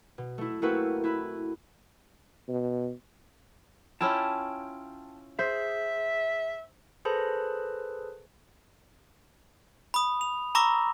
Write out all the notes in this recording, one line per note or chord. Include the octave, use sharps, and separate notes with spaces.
B2
A3 E4
A3 A#3 C4 E4 F#4 B4
E4 B4 B5
B2
C#4 E4 F4 G5 A5
G#4 C5 E5
G#4 A4 B4 C5 A5 B5
B5 D#6
F7
A#5 B5 C#6 D6 E6 A#6